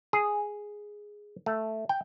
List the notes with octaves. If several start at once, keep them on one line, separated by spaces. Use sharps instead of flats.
G#4
A3
G5